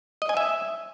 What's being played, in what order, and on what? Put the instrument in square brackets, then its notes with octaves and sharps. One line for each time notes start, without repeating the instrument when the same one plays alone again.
[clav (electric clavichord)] D#5
G#5
E5